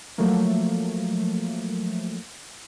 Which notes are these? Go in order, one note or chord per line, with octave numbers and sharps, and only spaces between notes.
F3 F#3 A3 A#3